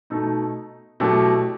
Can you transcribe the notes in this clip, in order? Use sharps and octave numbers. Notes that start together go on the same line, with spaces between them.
B2 A3 D#4
B2 F#3 A3 E4 G4